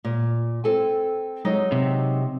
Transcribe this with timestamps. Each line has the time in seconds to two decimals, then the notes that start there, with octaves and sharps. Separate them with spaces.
0.05 A#2
0.64 C4 A4 G#5
1.45 F#3 G#3 D#4
1.72 C3